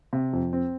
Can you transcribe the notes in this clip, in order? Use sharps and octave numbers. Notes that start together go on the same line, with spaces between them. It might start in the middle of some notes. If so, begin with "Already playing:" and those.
C3
F2
C4